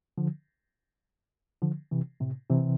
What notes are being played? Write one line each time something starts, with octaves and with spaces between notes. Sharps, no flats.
D3 F3
D3 F3
C3 E3
A2 C3
C3 E3